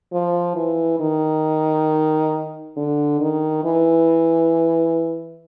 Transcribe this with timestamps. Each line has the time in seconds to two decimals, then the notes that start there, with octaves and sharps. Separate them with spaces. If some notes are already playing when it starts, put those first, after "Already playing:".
0.12 F3
0.56 E3
1.00 D#3
2.77 D3
3.20 D#3
3.64 E3